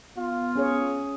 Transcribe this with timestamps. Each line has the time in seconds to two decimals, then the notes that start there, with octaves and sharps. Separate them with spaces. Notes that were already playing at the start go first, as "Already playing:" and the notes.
0.17 B3 F4
0.56 C#4 G#4 C#5